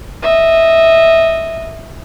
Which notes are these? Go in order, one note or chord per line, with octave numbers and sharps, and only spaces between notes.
D#5 E5